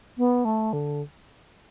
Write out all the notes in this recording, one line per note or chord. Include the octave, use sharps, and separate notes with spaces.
B3
A3
D3